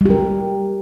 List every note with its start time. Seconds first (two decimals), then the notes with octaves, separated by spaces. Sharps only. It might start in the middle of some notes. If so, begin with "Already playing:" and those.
0.01 G3
0.06 G4
0.10 A#4